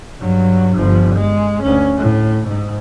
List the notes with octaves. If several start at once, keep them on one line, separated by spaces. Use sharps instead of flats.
G2 F#3
G1 F3
G#3
D2 C#4
A2
G#2